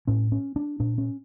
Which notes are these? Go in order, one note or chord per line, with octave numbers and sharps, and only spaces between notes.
A2 C#4
C#4
D4
A#2 D4
C#4